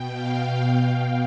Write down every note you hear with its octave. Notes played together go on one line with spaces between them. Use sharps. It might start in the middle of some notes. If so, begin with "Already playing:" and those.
Already playing: B2 G5
F5
G5